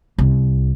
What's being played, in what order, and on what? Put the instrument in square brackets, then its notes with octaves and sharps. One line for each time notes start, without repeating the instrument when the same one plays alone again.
[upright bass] C2